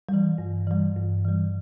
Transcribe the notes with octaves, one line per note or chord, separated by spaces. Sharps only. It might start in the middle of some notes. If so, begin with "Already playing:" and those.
E3 G3
G2
E3 G3
G2
E3 G3